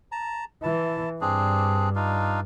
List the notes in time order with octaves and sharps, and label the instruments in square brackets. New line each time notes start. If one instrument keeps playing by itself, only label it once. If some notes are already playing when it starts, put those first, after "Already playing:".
[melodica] A5 A#5
[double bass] E3 [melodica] E4 A5
[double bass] G2 [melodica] C4 D4 G#4
[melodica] D4 D#4 F4